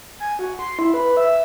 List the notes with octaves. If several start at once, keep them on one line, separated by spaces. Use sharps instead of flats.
G#5
F#4
C6
E4
B4
E5